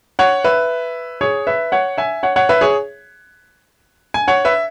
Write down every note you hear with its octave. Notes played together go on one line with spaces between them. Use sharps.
C#5 F#5
B4 E5
G#4 C#5
B4 E5
C#5 F#5
E5 G#5
C#5 F#5
C#5 F#5
B4 E5
G#4 C#5
G#5
C#5 F#5
B4 E5